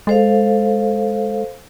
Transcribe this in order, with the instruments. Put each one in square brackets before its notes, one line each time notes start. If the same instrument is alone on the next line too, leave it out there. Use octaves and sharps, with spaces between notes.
[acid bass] G#3 [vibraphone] A4 C5 F5